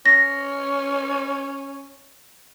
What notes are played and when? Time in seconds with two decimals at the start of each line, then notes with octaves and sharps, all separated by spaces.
0.06 C#4 A#6